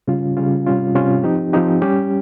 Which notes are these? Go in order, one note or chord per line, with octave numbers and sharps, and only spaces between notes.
C#3 G3 C#4 F4
C#3 G3 C#4 F4
C3 G3 C#4 F4
C3 G3 C#4 F4
F3 C4 D#4 G4
F3 C4 D#4 G4
G3 C#4 G4